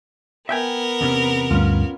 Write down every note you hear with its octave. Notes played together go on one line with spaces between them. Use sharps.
B3 A#4 E5 G5 G#5
E2 C3 C#4
D2 G2 C#4 F4